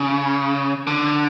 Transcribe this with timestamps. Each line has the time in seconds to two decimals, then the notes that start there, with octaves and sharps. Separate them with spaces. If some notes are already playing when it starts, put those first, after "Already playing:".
Already playing: C#3
0.87 D3